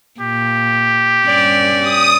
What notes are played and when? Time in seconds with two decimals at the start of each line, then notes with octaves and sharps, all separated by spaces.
0.21 A#2 G4
1.26 G2 C#4 D5
1.81 D#6